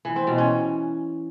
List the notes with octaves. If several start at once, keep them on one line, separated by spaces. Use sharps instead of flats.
E3
C4
B2
C#4